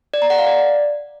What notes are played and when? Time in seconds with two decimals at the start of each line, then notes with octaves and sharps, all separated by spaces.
0.14 D5
0.22 A#5
0.30 F#5
0.38 F5
0.47 D5